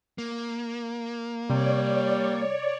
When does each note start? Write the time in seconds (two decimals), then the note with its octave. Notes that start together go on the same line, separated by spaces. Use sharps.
0.18 A#3
1.50 C3 G3 C#5 D5